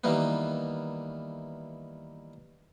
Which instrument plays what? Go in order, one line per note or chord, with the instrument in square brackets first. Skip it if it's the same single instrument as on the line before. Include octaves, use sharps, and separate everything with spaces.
[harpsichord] D#3 E3 G3 A#3 B3